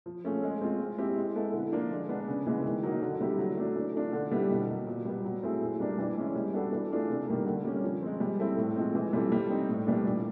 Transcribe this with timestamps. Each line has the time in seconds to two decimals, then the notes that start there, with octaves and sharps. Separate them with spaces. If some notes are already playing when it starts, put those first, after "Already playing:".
0.06 F3
0.25 A3 C#4 F4 G#4
0.43 G#3
0.61 C4 F4
0.80 G#3
0.98 C4 E4 G4
1.17 G#3
1.35 B3 E4 A4
1.54 D3
1.72 F3 A#3 D4 F4
1.91 G#3
2.09 B3 D4
2.28 C#3
2.47 E3 G#3 B3
2.65 D#3
2.83 F#3 A#3 D#4
3.02 D3
3.21 G3 C4 E4 G4
3.39 F#3
3.57 A3 D4
3.76 E3
3.94 A3 D4 F4
4.13 D3
4.32 G3 B3 E4 G4
4.50 B2
4.69 F#3 A#3
4.87 A#2
5.05 G3 B3
5.25 F#3
5.43 A3 C4 E4 G#4
5.61 A#2
5.80 G3 A#3 D4
5.98 E3
6.17 G#3 C#4 E4
6.36 G3
6.54 B3 D4 F#4 A4
6.72 E3
6.91 A3 D4 F4 G#4
7.09 C3
7.27 D#3 G3 A#3
7.46 D3
7.64 G3 A#3 C#4
7.83 F3
8.02 G#3 C4
8.20 G3
8.39 C4 E4 A4
8.57 A2
8.76 F3 G#3 C4
8.95 E3
9.13 G3 C4 F4 A4
9.32 G3
9.50 C4 D#4
9.69 A2
9.86 E3 G3 A#3 D4
10.05 A#2